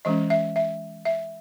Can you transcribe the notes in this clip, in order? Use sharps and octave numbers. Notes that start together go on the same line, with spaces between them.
E3 G#3 C#4 D#5
E5
E5
E5